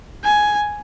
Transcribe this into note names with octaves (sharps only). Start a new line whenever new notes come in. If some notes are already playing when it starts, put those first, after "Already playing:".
G#5